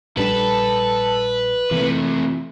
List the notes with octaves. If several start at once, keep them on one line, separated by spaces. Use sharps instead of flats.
A#1 G3 D4 A4 B4
C3 E3 A3 A#3